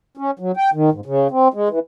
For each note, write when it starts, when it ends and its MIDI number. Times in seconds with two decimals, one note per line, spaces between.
0.17 0.31 61
0.39 0.52 54
0.57 0.70 79
0.73 0.90 51
0.92 1.01 44
1.06 1.27 49
1.31 1.48 60
1.54 1.69 56
1.69 1.79 52